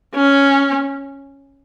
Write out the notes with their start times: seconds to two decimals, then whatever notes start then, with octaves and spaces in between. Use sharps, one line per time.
0.15 C#4